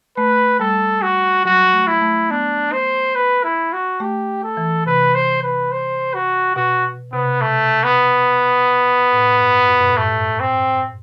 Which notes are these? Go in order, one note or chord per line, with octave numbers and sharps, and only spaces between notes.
A3 B4
G3 A4
F#4
F#3 F#4
A3
E4
A3
B3 D4
C5
B4
E4
F#4
A3 G4
A4
E3
C3 B4
C5
B4
C5
F#4
B2 F#4
C3 B3
B2 A3
B3
A2
G2
F#2
B2
A2
G2 A3
C4